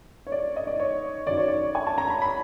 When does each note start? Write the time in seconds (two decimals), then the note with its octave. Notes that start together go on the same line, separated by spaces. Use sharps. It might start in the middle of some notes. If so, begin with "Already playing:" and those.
0.27 C#5
0.32 D5
0.56 D#5
0.67 D5
0.80 C#5
1.26 F#2 D#3 D5
1.37 C#5
1.48 D5
1.75 G#5
1.87 A5
1.98 A#5
2.10 B5
2.22 B5